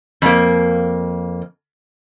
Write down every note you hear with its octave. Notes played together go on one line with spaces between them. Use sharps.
F2 A#3